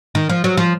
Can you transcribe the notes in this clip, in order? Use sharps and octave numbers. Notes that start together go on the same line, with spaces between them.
D#3
F3
F#3
F3